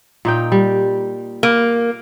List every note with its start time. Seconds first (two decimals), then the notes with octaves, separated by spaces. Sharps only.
0.25 A#2 D#4 G5
0.52 G3
1.43 A#3